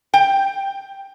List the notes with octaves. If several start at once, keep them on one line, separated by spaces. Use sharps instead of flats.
G5